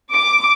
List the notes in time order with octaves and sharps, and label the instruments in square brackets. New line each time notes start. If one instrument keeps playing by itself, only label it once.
[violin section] D6